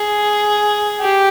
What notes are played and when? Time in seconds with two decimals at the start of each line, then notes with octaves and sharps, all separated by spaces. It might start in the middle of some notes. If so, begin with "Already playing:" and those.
Already playing: G#4
1.00 G4